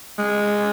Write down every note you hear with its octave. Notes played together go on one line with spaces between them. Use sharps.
G#3